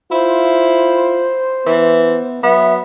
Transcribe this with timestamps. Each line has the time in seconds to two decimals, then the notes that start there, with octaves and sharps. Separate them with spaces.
0.12 E4 F4 C5
1.66 E3 B3
2.43 F#3 B3 E5